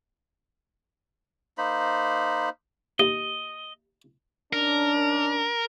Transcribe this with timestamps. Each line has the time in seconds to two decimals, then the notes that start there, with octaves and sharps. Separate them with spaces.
1.58 A#3 D#4 C5 B5
2.99 D#2 D#5
4.53 D#3 C#4 D4 A#4